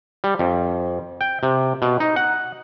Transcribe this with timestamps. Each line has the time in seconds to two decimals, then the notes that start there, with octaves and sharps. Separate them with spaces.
0.24 G3
0.39 F2
1.21 G5
1.43 C3
1.82 B2
2.00 D#4
2.16 F#5